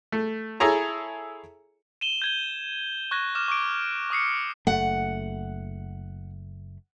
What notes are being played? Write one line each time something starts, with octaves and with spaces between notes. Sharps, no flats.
A3
E4 G#4 A4 C#5 A#5
D#7 E7 G7
G6 G#6 G7
C#6 F#6 G#6 A#6
D6 F6 E7
C#6 D6 D7
C#6 D#6 C7 C#7
F#1 A3 F#5